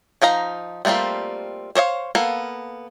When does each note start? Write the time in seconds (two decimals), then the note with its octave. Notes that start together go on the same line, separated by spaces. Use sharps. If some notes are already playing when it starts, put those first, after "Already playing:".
0.22 F3 D#4 F5 A#5
0.85 G3 A3 A#3 C4 F4
1.75 C5 C#5 D#5 F5
2.15 A#3 B3 A4 F5